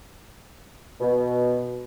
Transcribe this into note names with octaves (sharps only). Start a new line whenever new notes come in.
B2